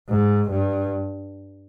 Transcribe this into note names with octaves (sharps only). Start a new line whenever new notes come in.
G#2
G2